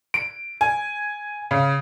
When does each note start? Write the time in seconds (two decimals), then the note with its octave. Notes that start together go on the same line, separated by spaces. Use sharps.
0.14 D7
0.61 G#5
1.51 C#3